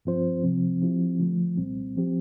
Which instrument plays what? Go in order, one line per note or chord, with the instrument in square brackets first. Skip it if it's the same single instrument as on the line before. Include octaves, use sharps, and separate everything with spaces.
[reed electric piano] G2 F3 C4 F4 C5
C2 C3 F3 C4
F3 C4 E4 G4
D3 F3 A3
C2 A#2 G3 C4
F3 C4 G4